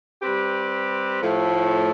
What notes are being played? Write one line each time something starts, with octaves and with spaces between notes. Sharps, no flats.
G3 C4 G4 B4
A2 F3 A3